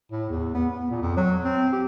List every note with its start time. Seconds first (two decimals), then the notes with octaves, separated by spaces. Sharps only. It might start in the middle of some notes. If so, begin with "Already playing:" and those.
0.12 A2
0.30 E2
0.55 B3
0.71 B3
0.90 A#2
1.02 F2
1.17 F#3
1.44 C4
1.73 G4